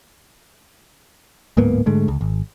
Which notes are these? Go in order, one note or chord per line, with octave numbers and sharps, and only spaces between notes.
D1 G#2 A#3 B3
G#2 D3 G#3 A3
C#2
G#1